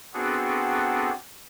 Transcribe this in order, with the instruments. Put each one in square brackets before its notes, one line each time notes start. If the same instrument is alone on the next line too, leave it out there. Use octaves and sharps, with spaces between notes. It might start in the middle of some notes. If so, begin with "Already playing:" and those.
[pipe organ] B3 C4 D4 F#4 G#4 A4